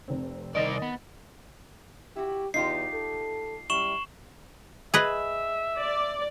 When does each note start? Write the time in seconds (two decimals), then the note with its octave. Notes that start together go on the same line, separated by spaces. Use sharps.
0.08 F1 C4
0.55 C2 D#3 D5 D#5 A6
0.82 B3
2.16 E4 F#4 G4
2.54 E2 D#4 F4 G4 C7
2.94 A4
3.70 F#2 G3 E4 C#6 E7 F#7
4.94 G#4 B4 D#5 E5
5.78 D5